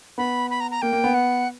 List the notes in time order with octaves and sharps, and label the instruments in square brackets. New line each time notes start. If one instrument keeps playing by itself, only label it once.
[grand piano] B3 [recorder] B5
[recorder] B5
A#5
A#5
[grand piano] A#3 [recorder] G5
[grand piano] A#3
B3
[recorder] F#5